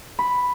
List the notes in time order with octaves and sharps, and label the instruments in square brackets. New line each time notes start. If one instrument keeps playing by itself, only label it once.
[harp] B5